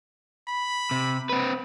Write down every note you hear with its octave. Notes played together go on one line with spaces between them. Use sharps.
B5
C3
C4 B4